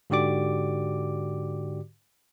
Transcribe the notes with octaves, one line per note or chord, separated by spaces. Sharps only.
G#2 D3 F#4 G4 D5 D6